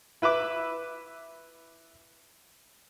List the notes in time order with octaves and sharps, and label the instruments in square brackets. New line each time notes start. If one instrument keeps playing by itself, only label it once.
[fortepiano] E4 B4 E5 D6